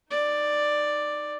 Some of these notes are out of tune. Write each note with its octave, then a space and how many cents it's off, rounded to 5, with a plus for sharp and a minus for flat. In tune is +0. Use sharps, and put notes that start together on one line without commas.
D#4 +0 D5 +5